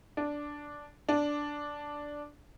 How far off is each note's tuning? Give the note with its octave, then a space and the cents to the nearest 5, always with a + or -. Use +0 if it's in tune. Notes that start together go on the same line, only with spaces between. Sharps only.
D4 -5
D4 -5